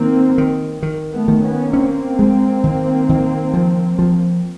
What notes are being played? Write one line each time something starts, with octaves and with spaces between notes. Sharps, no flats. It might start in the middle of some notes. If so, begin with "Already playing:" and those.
Already playing: D#3 A#3 C4
D#3
D#3
A3 B3
D#3
B3 C#4
A#3 C4 C#4
G#3
D#3
D#3
F3
F3